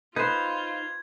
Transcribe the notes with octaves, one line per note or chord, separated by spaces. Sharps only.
D#4 F4 B4 C5 G#6